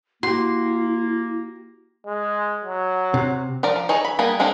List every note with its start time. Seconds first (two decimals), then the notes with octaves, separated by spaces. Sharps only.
0.23 A#3 E4 F#4 G4 C6
2.06 G#3
2.65 F#3
3.14 C3
3.63 F3 A#4 D5
3.76 F3
3.89 E3 D#4 G#4 A4 C#5
4.05 B5
4.19 G3 A#3 B3 G#4 B4
4.39 G#3 A#3 C4 D4 A4